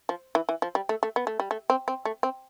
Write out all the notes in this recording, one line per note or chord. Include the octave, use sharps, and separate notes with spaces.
F3
E3
E3
F3
G3
A3
A3
B3
A3
G3
A3
C4
C4
A3
C4